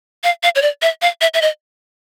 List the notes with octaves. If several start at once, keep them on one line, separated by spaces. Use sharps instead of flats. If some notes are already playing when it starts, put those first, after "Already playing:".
F5
F5
C#5
D5
E5
F5
E5
E5
D#5